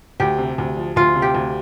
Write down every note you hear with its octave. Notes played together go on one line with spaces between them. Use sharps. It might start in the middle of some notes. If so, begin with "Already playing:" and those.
D2 G4
C3
D2
F3
D2 F4
C3
G4
D2